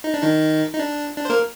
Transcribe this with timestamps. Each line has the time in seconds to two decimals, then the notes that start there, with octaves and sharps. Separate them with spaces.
0.04 D#4
0.14 D4
0.23 D#3 D#4
0.73 D#4
0.79 D4
1.17 D4
1.25 C5
1.30 A#3 A#4